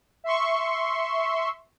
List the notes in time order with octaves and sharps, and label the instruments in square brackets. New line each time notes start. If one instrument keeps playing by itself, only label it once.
[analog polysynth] E5 C6 C#6